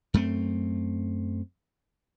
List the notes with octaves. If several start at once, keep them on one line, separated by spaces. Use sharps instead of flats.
F#2 A3 C4